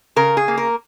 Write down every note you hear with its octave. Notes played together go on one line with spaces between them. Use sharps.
C#3 A#4
G#4
A#3
A#4